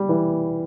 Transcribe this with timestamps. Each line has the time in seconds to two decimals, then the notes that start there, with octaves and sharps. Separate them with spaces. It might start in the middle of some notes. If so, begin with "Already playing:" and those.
Already playing: G3
0.09 E3